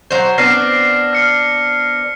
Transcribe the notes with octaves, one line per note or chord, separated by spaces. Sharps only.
F#3 C5
B3 C4 D4 F6 A#6 C7
F6 C#7